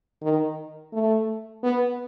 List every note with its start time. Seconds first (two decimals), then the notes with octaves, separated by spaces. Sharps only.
0.22 D#3
0.93 A3
1.63 B3